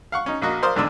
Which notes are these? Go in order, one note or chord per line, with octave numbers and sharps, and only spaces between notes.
F5 F#5 C#6
C#4 D#4
A#1 A#3 F#4 D#5
A#4 C5 D5 F5 C6 D#6
A1 E2 G#2 D3 D4 E6